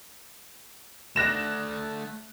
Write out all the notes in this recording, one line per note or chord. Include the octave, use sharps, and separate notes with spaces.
A3 D5 F#6 A#6 E7